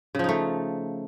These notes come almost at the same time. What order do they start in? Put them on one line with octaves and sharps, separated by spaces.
C#3 F3 D#4 A3